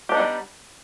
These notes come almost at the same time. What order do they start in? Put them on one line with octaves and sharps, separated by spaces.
G4 D4 D#4 B3 G3